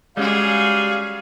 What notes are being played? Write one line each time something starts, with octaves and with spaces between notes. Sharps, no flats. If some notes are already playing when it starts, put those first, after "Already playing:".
G3 G#3 C#4 F#4 G#4 D5 F5